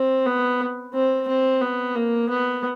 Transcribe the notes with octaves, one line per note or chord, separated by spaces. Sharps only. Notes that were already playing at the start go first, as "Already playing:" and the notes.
Already playing: C4
B3
C4
C4
B3
A#3
B3